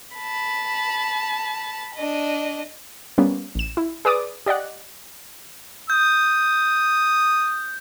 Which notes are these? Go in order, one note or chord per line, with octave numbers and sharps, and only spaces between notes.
A5 B5
D4 D#5
G3 A#3 B3 C#4
A1 E7
E4
G#4 B4 D5 D6 D#6
G4 D5 D#5 F#5
D#6 G6